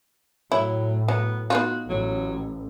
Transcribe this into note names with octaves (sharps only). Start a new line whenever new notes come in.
A2 F#3 E4
F#3 B3
B3 D#4 F4 F#4
A1 F#3